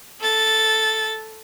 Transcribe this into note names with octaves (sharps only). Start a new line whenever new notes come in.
A4 A6